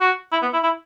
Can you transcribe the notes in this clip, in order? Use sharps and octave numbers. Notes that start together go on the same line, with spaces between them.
F#4
E4
B3
E4
E4